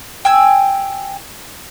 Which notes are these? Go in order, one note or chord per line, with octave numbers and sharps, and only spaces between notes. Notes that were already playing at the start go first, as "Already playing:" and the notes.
G5 G#5 E6